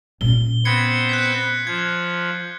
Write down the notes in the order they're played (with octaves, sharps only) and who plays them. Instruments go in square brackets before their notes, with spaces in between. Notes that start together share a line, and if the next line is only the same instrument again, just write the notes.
[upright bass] A#2 C#4 [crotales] G7
[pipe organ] B3 C4 B4 [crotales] G#6 C7 C#7
[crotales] F#6 G#6 B6
[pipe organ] F3 [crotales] G#6